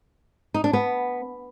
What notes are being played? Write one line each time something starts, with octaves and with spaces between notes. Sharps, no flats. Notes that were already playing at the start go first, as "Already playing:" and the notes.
D#4
D4
B3